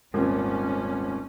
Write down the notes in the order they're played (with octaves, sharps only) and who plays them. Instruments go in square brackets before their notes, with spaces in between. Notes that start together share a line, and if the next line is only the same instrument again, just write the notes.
[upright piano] D#1 G#1 [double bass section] C#4